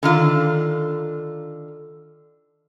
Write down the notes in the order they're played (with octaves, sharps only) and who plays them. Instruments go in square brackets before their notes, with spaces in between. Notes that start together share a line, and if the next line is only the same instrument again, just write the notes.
[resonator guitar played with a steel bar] D3 D#3 F4